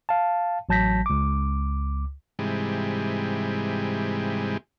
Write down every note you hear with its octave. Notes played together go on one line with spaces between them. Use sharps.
F5 A5
A1 F#3 A5 G6 A#6 B6
C#2 D6
G#2 C3 E3 G3 G#3